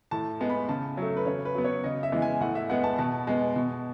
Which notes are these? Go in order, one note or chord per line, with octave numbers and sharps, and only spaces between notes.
A2 A5
G#3 B3
B5
C#3 A5
F#3 A3
B4
C#3 C#5
B4
F#3 B3
C#5
C#3 D#5
E5
E3 G#3 B3
G#5
A2 F#5
E5
G#3 B3 F#5
A5
B2 A5
G#3 B3
B2